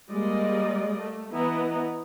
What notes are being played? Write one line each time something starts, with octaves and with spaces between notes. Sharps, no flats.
G3 G#3 A#3 D5 D#5
A3
E3 B3 E4 D#5 A#5